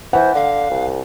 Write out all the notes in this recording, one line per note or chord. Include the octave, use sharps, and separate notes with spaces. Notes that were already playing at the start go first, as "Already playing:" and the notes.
E3 C5 F#5
D3 F5
C2